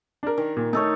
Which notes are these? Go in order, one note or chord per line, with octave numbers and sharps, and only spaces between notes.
D4 A#4
D#3
A#2
A3 D#4 A4 C#5